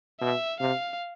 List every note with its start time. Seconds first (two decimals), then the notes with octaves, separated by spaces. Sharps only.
0.21 B2 E5
0.60 C3 F5